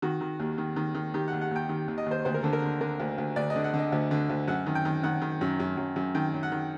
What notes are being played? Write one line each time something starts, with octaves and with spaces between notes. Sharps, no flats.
D#3 F#4
D#3
D#2
D#3
D#3
D#3
D#3 G4
F#5
D#2
F#5
D#2 G5
D#3
D#2
D#5
D#2 C5
D2 C5
A#4
D3 A4
A#4
D3
D3 A#4
D2
D2
D2 D5
D#5
D3
F#5
D3
D#5
D2
D3
D2
F#2 F#5
D#3
G5
D#3
D#3 F#5
D#3
F#2
F#2
F#2
F#2
D#3 G5
F#2
F#5
D#3